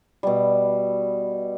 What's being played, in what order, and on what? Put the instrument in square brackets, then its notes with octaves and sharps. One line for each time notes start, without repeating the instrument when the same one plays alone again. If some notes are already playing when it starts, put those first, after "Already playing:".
[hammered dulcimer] B2 G3